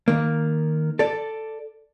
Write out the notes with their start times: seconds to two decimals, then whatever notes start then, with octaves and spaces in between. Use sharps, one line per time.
0.08 D#3 A#3
0.99 A4 D5